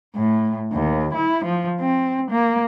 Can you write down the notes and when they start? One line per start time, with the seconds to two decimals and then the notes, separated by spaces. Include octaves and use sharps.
0.15 A2
0.73 D#2
1.14 E4
1.45 F3
1.80 C4
2.31 A#3